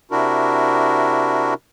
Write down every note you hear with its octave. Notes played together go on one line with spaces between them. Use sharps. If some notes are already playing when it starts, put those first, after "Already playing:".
C3 D4 E4 F#4 A#4